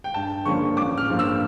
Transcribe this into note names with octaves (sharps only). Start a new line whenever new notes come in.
G5
G2 A5
D3 F3 A#3 C#4 C#6
A1 D6
F6
G2 F3 A#3
E6